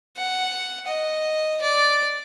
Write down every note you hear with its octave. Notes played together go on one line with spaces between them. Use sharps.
F#5
D#5
D5